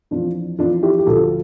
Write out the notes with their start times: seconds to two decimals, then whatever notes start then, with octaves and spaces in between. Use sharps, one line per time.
0.11 F2 E3 D4 F4
0.59 F2 E3 D4 F4
0.83 E4 G4
0.99 G4
1.06 D2 D3 F3 F4 A4